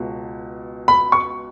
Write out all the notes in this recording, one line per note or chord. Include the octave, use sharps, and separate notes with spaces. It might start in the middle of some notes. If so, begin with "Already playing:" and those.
Already playing: C#2 B2
B5
C#6